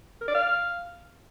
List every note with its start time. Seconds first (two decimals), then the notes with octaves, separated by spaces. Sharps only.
0.21 A#4
0.28 D5
0.35 F5